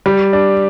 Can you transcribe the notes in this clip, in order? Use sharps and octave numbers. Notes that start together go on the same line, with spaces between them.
G3
D4